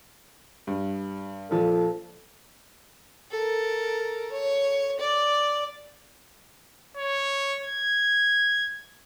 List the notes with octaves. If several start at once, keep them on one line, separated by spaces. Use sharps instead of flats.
G2
A#1 F3 A4
A4 A#4
C#5
D5
C#5
G#6